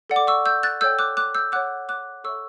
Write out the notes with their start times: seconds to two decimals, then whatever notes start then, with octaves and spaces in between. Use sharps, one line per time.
0.10 A4 D5 F#5
0.16 D6
0.27 C#6 E6
0.46 E6 G6
0.63 F#6 A6
0.81 A4 C#5 G5 E6 G6
0.99 D6 F#6
1.17 D6 F#6
1.35 E6 G6
1.52 C#5 F#5 D6 F#6
1.89 D6 F#6
2.24 A4 C#5 E5 C#6 E6